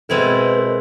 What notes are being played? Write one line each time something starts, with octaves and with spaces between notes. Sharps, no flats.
B2 G#3 C4 E4 A4
A#4
B4
A#4